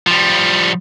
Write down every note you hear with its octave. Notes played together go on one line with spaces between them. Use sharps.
F3 G3